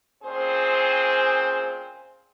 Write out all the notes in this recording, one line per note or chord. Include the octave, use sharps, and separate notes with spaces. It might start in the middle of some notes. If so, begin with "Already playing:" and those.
A#2 C4 C#4 G#4 C5